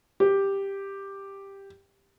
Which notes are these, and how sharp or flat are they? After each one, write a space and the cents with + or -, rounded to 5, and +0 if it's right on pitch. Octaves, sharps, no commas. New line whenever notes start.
G4 +5